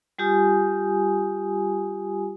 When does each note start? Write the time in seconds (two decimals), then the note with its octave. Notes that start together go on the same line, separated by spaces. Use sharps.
0.18 G3 F4 G4 G#5 D#6